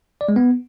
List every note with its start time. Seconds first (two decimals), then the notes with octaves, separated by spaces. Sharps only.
0.21 D5
0.29 G#3
0.36 B3